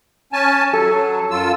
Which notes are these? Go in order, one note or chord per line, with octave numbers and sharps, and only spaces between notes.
C#4 G#5 A5
F#3 A4
F#2 F4 E6